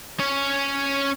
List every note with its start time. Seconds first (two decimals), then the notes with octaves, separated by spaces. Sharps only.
0.20 C#4 C#5